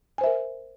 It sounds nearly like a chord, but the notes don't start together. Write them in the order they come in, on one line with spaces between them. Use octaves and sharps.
G#5 C5 E5 A#4